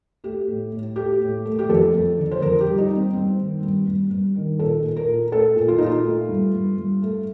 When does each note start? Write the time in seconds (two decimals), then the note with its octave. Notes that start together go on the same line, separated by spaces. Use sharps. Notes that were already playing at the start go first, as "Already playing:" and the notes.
0.24 A3 G4
0.48 A2
0.72 A2
0.96 A3 G4
1.20 A2
1.45 A3
1.59 G4
1.69 F2 A4
1.94 F2
2.18 D3
2.31 C5
2.42 F2 A#4
2.60 G4
2.66 G3
2.78 D#4
2.90 G3
2.96 C4
3.13 G2 C4
3.38 D#3
3.62 G2
3.87 G2
4.11 G2
4.36 D#3
4.59 A#2 A4
4.84 A#2
4.97 A#4
5.08 A#2
5.32 A3 A4
5.56 A#2
5.68 F4
5.78 A#2 D#4
5.86 F4
6.05 A3
6.29 G2
6.54 G2
6.77 G2
7.02 A3